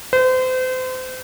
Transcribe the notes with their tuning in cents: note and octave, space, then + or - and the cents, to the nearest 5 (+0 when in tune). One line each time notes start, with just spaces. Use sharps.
C5 -35